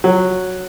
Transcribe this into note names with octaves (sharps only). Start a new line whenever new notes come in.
F#3